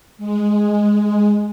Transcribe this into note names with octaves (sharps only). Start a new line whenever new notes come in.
G#3